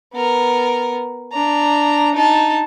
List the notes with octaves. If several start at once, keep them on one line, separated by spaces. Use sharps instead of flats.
B3 A#4
D4 A#5
D#4 A5